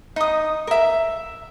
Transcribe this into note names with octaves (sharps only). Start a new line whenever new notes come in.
D#4 D#6
A#4 E5